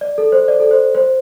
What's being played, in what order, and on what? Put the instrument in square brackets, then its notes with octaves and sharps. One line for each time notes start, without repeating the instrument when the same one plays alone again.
[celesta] D5
A4
C5
D5
A4
C5
C5